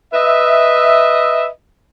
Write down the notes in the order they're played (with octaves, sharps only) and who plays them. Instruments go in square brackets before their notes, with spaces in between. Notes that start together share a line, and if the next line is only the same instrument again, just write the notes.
[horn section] B4 D#5 E5